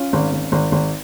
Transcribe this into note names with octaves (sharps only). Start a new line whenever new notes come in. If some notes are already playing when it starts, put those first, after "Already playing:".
Already playing: C#4 F4
G#1
G#1
G#1
G#1